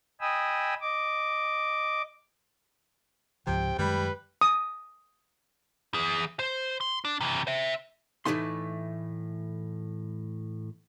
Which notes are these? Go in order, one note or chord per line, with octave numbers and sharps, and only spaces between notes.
D#5 G5 G#5 B5 D#6 E6
D#5 D6
C#2 G#2 C3 F3 G5
F#2 D#3 G3 G#3 B4
D#6
E3 G#4
C5
C6
D4
C3 E3
C5 E5
A2 E3 G#3 A3 D#4 C6